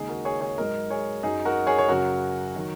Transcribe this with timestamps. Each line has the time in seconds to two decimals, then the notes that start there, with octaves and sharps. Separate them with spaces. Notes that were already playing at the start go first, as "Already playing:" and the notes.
Already playing: D#2 C#3 G#3 D#4 G#4
0.09 F#4 A#4
0.25 G#4 C#5
0.41 G#4 C#5
0.58 G#2 F#3 A#4 D#5
0.90 G#4 C#5
1.23 F#2 F#3 D#4 G#4
1.45 F#4 A#4
1.67 G#4 C#5
1.78 C#5
1.89 F#2 C#3 F#3 F#4 A#4
2.56 D#3 F#3